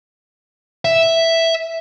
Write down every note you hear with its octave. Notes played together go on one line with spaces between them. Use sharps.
E5